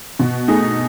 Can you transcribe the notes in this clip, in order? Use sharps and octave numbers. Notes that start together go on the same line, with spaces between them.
B2
A3 D#4 G#4